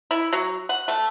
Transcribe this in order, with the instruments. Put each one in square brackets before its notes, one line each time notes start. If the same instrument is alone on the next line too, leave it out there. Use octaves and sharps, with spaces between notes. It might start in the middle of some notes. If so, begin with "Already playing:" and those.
[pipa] E4
F#3
F#5
A3